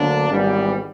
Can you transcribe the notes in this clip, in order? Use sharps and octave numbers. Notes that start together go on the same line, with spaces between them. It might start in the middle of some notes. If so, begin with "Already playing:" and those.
Already playing: D2 D3 F#3 A#3 D4
G#1 G#2 E3 G3 B3